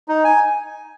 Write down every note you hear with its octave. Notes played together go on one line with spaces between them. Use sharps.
D#4
G#5